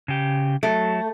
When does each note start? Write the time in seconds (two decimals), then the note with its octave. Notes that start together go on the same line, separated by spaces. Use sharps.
0.08 C#3 G4
0.63 F#3 A3